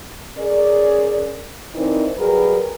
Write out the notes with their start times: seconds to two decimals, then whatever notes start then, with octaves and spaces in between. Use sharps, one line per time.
0.37 C#4 G#4 A#4 D5
1.75 E3 C4 D4 D#4 A#4
2.17 F#3 G3 G#4 A#4 B4